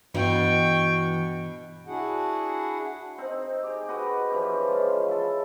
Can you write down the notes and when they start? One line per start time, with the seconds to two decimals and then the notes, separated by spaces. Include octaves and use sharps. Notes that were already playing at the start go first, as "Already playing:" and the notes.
0.14 G2 B2 E3 G5 C#6
1.87 D4 E4 F#4 G#4 F#5
3.18 C4 D#4
3.63 G4 G#4
3.89 F#4 G4 B4 D#5
4.30 E3 F3 C#4 G4
4.68 C#3 G#3 F4
5.08 E4 A4